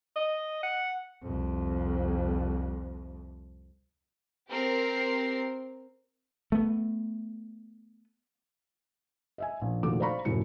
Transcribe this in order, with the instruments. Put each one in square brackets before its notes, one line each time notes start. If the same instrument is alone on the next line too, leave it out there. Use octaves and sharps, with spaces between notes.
[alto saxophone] D#5
F#5
[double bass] C2 F2
[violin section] C4 G4 A#4 C7
[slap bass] A3 B3
[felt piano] D#5 E5 G#5
A#1
F1 A#2 D#3 F#4 A4 D6
C5 D5 F5 A#5 B5 C#6
F1 F#2 A2 E4 C#7